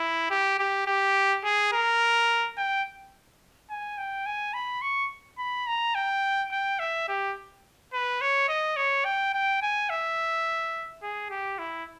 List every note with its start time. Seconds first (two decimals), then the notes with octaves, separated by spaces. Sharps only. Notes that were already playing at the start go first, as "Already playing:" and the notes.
Already playing: E4
0.31 G4
0.59 G4
0.87 G4
1.44 G#4
1.73 A#4
2.57 G5
3.70 G#5
3.98 G5
4.26 G#5
4.54 B5
4.82 C#6
5.38 B5
5.67 A#5
5.95 G5
6.52 G5
6.79 E5
7.09 G4
7.93 B4
8.21 C#5
8.48 D#5
8.77 C#5
9.05 G5
9.34 G5
9.62 G#5
9.90 E5
11.03 G#4
11.31 G4
11.59 E4